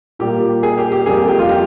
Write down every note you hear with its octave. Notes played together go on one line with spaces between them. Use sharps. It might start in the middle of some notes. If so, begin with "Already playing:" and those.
A#2 G3 A#3 G4
G#4
G4
G4
F2 C3 G3 A#3 G#4
G4
G4
F4
G4